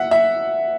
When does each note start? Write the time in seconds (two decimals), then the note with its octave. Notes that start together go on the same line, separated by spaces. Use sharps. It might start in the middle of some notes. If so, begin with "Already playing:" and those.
Already playing: E5 F#5
0.11 E5